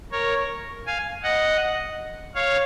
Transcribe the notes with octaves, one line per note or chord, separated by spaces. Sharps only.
A#4 C#5
F5 G#5
D#5 F#5
C#5 F5